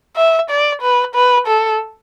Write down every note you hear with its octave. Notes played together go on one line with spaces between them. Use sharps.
E5
D5
B4
B4
A4